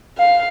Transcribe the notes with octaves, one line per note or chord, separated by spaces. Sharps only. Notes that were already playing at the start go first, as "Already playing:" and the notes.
F5